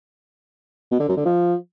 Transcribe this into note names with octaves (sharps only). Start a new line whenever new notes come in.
B2
D3
F#2
D3
F3